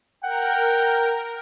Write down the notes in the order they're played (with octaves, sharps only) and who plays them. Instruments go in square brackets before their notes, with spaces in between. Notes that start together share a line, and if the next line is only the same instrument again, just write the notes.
[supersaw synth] A#4 [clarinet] F#5 [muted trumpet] G5